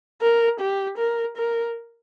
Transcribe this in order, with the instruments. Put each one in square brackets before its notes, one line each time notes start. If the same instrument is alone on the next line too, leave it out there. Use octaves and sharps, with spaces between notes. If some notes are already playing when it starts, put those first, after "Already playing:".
[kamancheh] A#4
G4
A#4
A#4